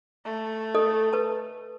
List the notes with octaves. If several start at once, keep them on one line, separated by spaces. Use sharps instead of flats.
A3
A4 D#5
B4 A5